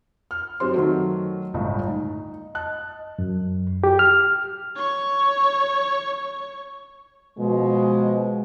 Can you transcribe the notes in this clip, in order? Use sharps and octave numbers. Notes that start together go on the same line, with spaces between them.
F6
F#2 C4 G4 C5 C6
D#3 F#3 A3
G1 C#2 A2 D#5
D#4
D#5 A5 F#6
F#2
G4
F6
C#5 C#6
B2 F3 G#3